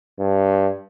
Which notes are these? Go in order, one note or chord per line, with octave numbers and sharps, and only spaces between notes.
G2